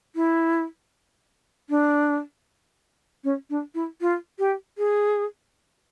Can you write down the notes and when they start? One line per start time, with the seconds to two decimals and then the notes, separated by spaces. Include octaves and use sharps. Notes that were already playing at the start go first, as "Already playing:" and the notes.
0.16 E4
1.70 D4
3.24 C#4
3.50 D4
3.75 E4
4.01 F4
4.39 G4
4.78 G#4